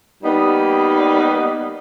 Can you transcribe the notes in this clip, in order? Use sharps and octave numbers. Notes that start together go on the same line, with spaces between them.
G3 A#3 B3 D#4